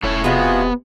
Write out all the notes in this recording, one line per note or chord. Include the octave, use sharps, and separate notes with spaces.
E1 A3 C#4 E4 C#5
C3 F3 G#3 B3 F4 F#4 G#4